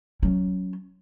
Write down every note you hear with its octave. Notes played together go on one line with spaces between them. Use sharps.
F#3 C#4